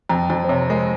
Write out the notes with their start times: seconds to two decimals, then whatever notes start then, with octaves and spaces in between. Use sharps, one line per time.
0.09 F2 A#5
0.30 F2
0.44 C5
0.49 C3 C#5
0.70 G#3 A#4